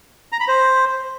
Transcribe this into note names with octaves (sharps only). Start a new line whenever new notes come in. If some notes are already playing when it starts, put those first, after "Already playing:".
A#5
B5
C5